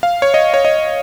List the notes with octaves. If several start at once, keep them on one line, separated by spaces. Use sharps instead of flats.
F5
C#5
D#5
C#5
D#5